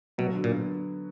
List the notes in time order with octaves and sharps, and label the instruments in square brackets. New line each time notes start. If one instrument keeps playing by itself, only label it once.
[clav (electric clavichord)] B2 [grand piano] F#3
[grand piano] D3
[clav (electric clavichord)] A#2
[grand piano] B3